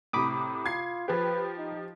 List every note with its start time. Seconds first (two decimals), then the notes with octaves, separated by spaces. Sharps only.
0.13 A2 C3 B5 D6 D#6
0.66 F4 G#6 C7
1.08 F3 G4 B4
1.58 D#4